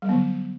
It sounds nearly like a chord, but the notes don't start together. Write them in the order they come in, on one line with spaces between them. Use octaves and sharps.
G3 F#3 B3 D3